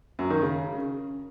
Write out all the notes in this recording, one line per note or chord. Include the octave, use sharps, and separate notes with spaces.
F#2
D#3
C#3